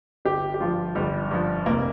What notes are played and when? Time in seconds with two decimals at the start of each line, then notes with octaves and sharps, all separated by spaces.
0.25 G1 G4
0.54 G4
0.60 G2 F3 F4
0.95 G1 G3
1.31 G2 F3
1.66 F1 A#3